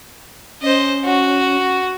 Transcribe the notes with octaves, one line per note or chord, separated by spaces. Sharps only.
C#4 C5 D#5
F#4